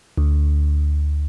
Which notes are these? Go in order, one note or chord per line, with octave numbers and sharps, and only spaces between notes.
D2